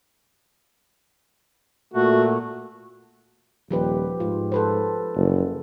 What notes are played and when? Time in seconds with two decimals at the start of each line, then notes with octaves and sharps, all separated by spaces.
1.94 A#2 A3 F#4
3.71 D#1 F3 G4 B4
4.20 G#2 F4
4.52 A4 B4 C5
5.15 F#1